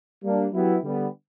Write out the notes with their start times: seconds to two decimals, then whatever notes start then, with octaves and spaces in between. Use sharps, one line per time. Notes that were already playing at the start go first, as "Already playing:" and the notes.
0.23 G3 A#3 D4
0.53 F#3 B3 E4 G4
0.83 D3 G3 B3